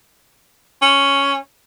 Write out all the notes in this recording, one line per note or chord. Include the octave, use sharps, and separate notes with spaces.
C#4